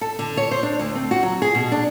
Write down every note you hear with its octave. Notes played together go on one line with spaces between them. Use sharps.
A4
D3
C#5
C5
D4
D2
C4
F#4
F#3
G#4
B2
D4